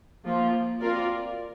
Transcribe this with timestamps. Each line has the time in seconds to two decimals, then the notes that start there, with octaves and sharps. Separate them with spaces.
0.25 F3 A#3 F4
0.80 C4 F4 A#4 D5